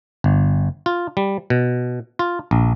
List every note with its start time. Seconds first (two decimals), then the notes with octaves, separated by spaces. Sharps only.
0.24 G1
0.86 F4
1.17 G3
1.50 B2
2.19 F4
2.51 A#1